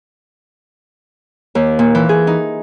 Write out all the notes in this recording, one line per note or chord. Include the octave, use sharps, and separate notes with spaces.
D#2
A#2
E3
G#4
D#4